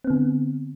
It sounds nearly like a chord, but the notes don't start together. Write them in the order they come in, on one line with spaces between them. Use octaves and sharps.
C4 B3 D3